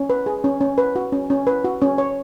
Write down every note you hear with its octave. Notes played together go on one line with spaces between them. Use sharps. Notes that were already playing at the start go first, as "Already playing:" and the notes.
Already playing: C#4
B4
G#4
C#4
C#4
B4
F#4
C#4
C#4
B4
F#4
C#4
C#5